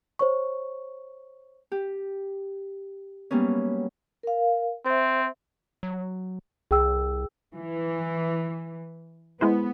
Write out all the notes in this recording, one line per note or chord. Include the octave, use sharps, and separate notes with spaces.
C5 C#5 C#6
G4
F#3 G3 A#3 B3 C#4
A#4 F5
C4 C5 E5
F#3
C2 G#4 G5 E6
E3
G#3 B3 E4 C5